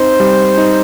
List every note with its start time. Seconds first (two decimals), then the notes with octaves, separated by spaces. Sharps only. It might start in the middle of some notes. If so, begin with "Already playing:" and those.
Already playing: C4 D#4 C5
0.20 G3
0.58 D#4